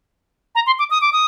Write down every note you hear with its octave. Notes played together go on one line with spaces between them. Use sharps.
A#5
C6
D6
D#6
D6
D#6